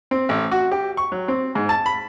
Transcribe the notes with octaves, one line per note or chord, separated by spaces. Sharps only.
C4
A1
F#4
G4
C#6
F#3
C4
G#2
A5
B5